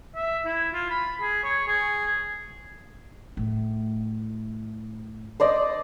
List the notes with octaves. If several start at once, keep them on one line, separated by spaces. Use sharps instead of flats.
E5
E4
F4
B5
G#4
C#5
G#4
A2
C5 D5 D#5